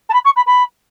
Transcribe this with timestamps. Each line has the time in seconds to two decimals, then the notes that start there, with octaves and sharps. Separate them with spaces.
0.09 A5
0.13 B5
0.25 C#6
0.36 B5
0.47 B5